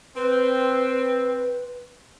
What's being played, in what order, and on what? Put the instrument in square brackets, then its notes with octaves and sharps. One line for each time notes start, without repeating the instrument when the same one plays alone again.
[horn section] C4 [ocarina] B4